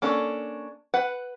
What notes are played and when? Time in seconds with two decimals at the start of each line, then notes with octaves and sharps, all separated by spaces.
0.02 A#3 C#4 D4 A4
0.94 B4 F#5